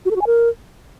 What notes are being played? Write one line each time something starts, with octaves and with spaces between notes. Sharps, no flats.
F#4
A4
F#4
G#5
A#4